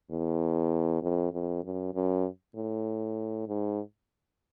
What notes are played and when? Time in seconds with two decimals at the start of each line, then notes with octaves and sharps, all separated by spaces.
0.10 E2
1.02 F2
1.33 F2
1.64 F#2
1.94 F#2
2.56 A2
3.48 G#2